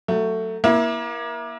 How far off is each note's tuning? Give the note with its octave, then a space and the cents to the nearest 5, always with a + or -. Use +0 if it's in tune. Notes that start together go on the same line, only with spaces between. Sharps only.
F#3 +0 A3 +15
A#3 +30 E4 +0